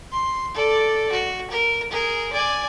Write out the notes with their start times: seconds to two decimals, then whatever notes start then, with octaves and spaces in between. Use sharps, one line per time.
0.12 C6
0.54 A4 D5
1.11 F#4
1.50 A#4
1.91 G#4 A#4
2.32 D5 G#5